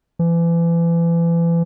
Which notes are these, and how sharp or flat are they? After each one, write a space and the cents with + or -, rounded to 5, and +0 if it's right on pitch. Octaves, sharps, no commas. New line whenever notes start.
E3 +35